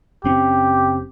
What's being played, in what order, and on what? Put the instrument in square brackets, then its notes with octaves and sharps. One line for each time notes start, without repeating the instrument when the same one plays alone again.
[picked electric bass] F#1 C4 C#4 [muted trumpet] G4